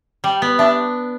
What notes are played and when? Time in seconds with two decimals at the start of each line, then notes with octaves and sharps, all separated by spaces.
0.24 G3 G5
0.42 B3
0.59 D4 E5